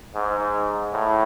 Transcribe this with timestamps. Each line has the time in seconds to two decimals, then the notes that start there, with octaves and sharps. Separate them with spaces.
0.15 G#2
0.93 A2